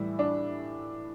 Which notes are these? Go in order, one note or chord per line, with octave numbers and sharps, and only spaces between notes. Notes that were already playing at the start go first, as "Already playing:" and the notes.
Already playing: A2 E3 G3 E4
D4